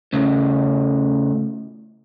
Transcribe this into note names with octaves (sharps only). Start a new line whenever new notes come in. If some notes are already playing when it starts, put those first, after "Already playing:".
A2 C#3 A3